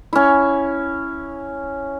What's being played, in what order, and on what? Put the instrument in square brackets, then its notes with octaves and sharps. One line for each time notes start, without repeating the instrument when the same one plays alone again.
[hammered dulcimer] C#4 E4